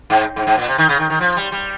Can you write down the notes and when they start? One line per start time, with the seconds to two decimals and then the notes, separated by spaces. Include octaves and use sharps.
0.10 G#2
0.36 G#2
0.47 G#2
0.57 A#2
0.68 C3
0.78 D#3
0.89 C#3
0.99 D#3
1.10 D#3
1.20 F3
1.37 G3
1.52 G3